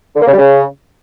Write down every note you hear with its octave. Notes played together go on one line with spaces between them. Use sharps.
D3
A#3
C#3
G3
C#3